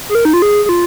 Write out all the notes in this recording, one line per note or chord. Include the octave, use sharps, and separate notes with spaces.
G#4
A#4
D#4
F4
G#4
G#4
F4